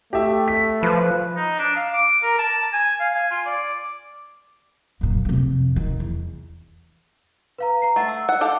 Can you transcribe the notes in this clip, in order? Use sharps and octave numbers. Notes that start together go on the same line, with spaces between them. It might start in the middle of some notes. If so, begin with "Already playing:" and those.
A3 G4 E5
B6
F3 B4
D#4
D4
F5
D6
A#4
A5
G#5
F5
G#5
F4
D5
F#2 A#2
F2 C3
D#3
E2
B4 F5 A#5
A#5 C7
A3 F#5 A6
E6
F#5
G4 A4 F5